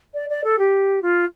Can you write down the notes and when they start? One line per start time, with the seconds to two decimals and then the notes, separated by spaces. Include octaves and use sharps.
0.14 D5
0.29 D5
0.44 A4
0.59 G4
1.02 F4